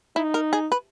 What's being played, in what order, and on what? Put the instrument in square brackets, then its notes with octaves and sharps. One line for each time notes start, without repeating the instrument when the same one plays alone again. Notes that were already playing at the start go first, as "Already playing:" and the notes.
[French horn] D#4 [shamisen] E4
[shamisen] A#4
G#4
B4